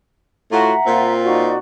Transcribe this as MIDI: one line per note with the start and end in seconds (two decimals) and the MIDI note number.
0.51 0.73 45
0.51 0.73 65
0.51 0.73 66
0.51 1.12 76
0.51 1.12 78
0.51 1.12 82
0.86 1.56 46
0.86 1.56 60
0.86 1.56 65
1.25 1.57 63
1.25 1.57 66
1.25 1.57 74